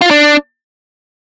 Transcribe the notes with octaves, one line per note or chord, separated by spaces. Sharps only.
F4
D4